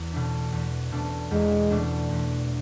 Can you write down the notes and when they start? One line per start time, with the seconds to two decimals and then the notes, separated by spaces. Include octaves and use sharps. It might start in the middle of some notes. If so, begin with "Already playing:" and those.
Already playing: E2
0.13 B2 A3 D4
0.52 E2
0.92 B2 A3 D4
1.31 E2 G#3
1.70 B2 A3 D4
2.11 E2